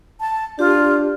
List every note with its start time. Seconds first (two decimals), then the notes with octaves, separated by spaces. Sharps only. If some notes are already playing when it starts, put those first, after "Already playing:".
0.20 A5
0.59 D4 F4 G4